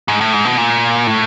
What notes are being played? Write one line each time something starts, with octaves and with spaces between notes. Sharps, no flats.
G#2
A2
G#2
B2
A#2
A2